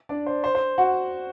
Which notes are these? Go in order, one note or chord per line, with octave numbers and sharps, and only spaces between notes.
D4 D5
C5
C5
C5
F#4 F#5